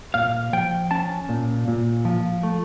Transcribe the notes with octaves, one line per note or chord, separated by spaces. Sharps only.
A#2 F5
F3 G5
C#4 A5
A#2
A#2
F3
A3